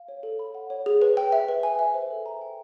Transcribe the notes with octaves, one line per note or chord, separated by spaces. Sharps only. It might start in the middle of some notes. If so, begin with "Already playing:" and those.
Already playing: F5
C#5
A4
B5
F#5
C#5
G#4
B4
G5
E5
B4
G#5
E5
C5
A4
A#5
G5